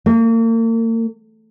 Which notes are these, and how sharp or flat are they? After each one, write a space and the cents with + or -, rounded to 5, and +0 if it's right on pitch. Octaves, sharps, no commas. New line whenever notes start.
A#3 -40